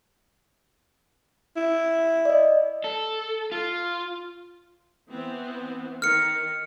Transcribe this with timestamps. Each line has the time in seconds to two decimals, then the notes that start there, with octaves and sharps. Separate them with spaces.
1.56 E4
2.25 D5 D#5
2.84 A4
3.52 F4
5.10 E3 B3 C4
6.02 D#3 F6 C#7